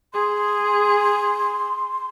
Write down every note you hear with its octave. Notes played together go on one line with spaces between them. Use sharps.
G#4 C6